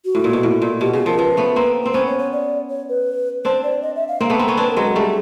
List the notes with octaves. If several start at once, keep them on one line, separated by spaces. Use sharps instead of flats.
F#4
A2
A#2
B2
A2
A#2
B2 G4
C#3 G#4
F3 A#4
F3 B4
A3 B3
A#3 C4
C4
B3 C#4 C5
C#5
C#5
D5
C#5
B4
C4 D4 C5
D5
D#5
E5
F5
A#3 C4
A3 B3
A#3 C4
B3 C#4
C4 D4 B4
A#4
F#3 G#3
A4
G3 A3 G#4